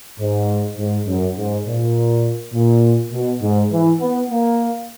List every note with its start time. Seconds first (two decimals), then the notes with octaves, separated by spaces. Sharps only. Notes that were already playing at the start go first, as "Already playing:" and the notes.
0.20 G#2
0.78 G#2
1.06 F#2
1.37 G#2
1.66 A#2
2.53 A#2
3.12 B2
3.41 G#2
3.71 E3
4.00 B3
4.30 A#3